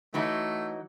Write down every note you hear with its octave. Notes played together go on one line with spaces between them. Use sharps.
E3 F#3 A3 D#4